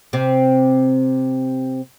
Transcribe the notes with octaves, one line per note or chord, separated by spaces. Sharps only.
C3 C4